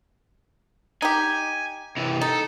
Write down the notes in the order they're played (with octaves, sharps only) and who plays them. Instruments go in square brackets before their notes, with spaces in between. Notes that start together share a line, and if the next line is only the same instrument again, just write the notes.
[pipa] D#4 G4 [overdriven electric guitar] G#5
[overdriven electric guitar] C3 E3
[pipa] D#4 [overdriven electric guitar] A4